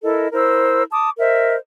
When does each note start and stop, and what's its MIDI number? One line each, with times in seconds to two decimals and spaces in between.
0.03 0.28 64
0.03 0.28 69
0.03 0.28 70
0.03 0.28 75
0.33 0.83 64
0.33 0.83 70
0.33 0.83 72
0.33 0.83 88
0.91 1.10 81
0.91 1.10 86
0.91 1.10 87
1.19 1.55 70
1.19 1.55 72
1.19 1.55 75
1.19 1.55 76